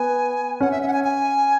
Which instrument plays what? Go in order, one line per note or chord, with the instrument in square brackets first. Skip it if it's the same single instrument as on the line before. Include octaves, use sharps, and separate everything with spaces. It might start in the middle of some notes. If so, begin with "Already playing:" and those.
Already playing: [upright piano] B3 [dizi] G#5
[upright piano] C#4 [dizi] F#5
[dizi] E5
E5
F#5
G#5
G#5